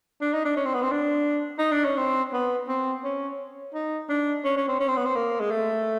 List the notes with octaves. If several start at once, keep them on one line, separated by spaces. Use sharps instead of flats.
D4
D#4
D4
C#4
C4
B3
C4
D4
D#4
D4
C#4
C4
B3
C4
C#4
D#4
D4
C#4
C#4
C4
C#4
C4
B3
C4
A#3
G#3
A3